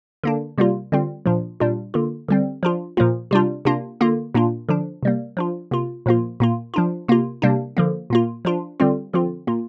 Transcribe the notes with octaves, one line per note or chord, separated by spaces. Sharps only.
D3 A#3 D4
C3 G3 A#3 F4
D3 G3 C4 F4
A#2 F3 D4 F4
A#2 G3 D4 F4
D3 A#3 F4
D3 G3 C4
F3 D4 F4
A#2 F3 A#3 F4
C3 G3 D4 F4
C3 A#3 D4 F4
D3 A#3 F4
A#2 A#3 D4 F4
D3 F3 D4
C3 G3 A#3
F3 D4 F4
C3 A#3 F4
A#2 F3 A#3 F4
A#2 A#3 F4
F3 D4 F4
C3 A#3 F4
C3 G3 A#3 D4
D3 F3 A#3
A#2 A#3 F4
F3 D4 F4
D3 G3 C4 F4
D3 F3 C4 F4
A#2 A#3 F4